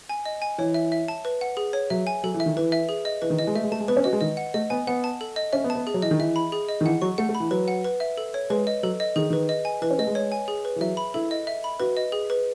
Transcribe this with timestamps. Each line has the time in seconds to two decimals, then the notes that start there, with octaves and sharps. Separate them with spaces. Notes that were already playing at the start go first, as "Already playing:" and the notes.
0.09 G#5
0.25 D#5
0.42 G#5
0.58 E3 C#5
0.74 E5
0.92 E5
1.08 A5
1.25 B4
1.41 F#5
1.57 G#4
1.73 C#5
1.90 F#3 E5
2.07 G#5
2.23 F#3 A4
2.34 E3
2.40 E5
2.46 D#3
2.57 E3 B4
2.72 E5
2.89 G#4
3.05 D#5
3.22 E3 B4
3.30 D#3
3.39 E3 D#5
3.47 G#3
3.55 A3 E5
3.63 G#3
3.72 A3 A5
3.80 G#3
3.88 B3 B4
3.97 C#4
4.04 F#4 D#5
4.13 G#3
4.21 D#3 D#5
4.37 F#5
4.54 A3 D#5
4.70 B3 G#5
4.87 B3 F#5
5.04 A5
5.21 A4
5.36 D#5
5.53 C#4 E5
5.64 B3
5.70 A5
5.75 B3
5.87 G#4
5.94 F#3
6.02 E3 D#5
6.11 D#3
6.19 E3 E5
6.36 B5
6.52 G#4
6.69 D#5
6.81 D#3
6.85 E3 F#5
7.01 F#3 C#6
7.18 A3 F#5
7.29 A3
7.35 B5
7.40 E3
7.51 F#3 B4
7.68 F#5
7.84 B4
8.00 E5
8.18 A4
8.34 C#5
8.50 G#3 B4
8.67 D#5
8.83 F#3 A4
9.00 D#5
9.16 D#3 G#4
9.30 D#3 B4
9.49 D#5
9.65 G#5
9.82 E3 B4
9.90 C#4
9.99 A3 D#5
10.07 G#3
10.15 C#5
10.32 G#5
10.48 G#4
10.65 B4
10.76 E3
10.80 F#3 E5
10.97 B5
11.14 E4 A4
11.31 D#5
11.47 E5
11.64 B5
11.80 F#4 B4
11.97 D#5
12.12 G#4
12.30 B4